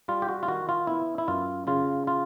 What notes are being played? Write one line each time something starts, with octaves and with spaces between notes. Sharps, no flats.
G3 F4
G4
F#4
F4
D#3 F#4
F4
B3 E4
E4
F#2 F4
C#3 F4
F4